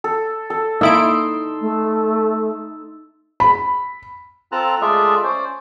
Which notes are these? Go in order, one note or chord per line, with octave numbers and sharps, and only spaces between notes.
A4
A4
A#3 D#4 E4 E5 C6 D7
A3
B5
C4 F4 A4 A5 A#5 F#6
G#3 A3 F4 G#4 D5 E5
C#4 C5 D5